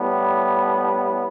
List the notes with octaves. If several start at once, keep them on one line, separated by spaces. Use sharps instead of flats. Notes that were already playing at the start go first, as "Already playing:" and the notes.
Already playing: A2 G3 B3